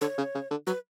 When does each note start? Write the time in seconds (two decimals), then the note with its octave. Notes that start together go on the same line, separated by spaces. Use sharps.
0.01 D3 C#5
0.18 C#3
0.35 C#3
0.51 D3
0.67 F#3 B4